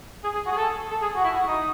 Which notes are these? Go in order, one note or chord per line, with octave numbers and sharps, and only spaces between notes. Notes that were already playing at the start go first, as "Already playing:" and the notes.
G#4
G#4
F#4
G#4
A4
A4
G#4
F#4
E4
F#4
D#4